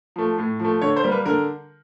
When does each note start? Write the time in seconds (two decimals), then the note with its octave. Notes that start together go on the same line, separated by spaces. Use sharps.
0.16 F3 A3
0.38 A2
0.60 F3
0.65 A3
0.82 D3 C#5
0.96 C5
1.04 G3 A#3
1.12 B4
1.26 D3 A#4